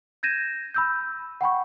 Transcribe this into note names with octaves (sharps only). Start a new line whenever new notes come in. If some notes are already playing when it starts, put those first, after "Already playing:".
G6 G#6 A#6 D#7 E7
B5 E6 G6
F#5 G5 B5 C#6